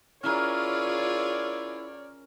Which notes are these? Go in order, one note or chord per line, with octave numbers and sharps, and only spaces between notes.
C#4 E4 F4 G#4 A#4 C#5 D5